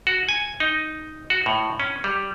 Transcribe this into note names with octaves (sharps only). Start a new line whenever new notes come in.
F#4
G#5
D#4
F#4
A2
C#4
G3